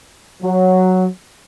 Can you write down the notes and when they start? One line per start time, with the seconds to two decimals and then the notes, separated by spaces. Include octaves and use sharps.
0.42 F#3